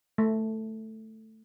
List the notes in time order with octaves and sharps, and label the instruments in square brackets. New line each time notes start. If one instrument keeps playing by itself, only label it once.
[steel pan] A3